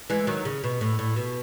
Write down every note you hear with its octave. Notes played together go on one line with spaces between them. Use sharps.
E3 G#3
D#3 F#3
C#3
B2
A2
A2
B2